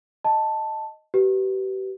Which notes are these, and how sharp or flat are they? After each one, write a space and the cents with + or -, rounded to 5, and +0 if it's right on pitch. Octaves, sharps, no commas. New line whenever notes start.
D#5 +0 A5 +0
G4 -35 B4 +0